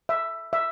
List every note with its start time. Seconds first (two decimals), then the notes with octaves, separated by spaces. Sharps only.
0.09 E5
0.53 E5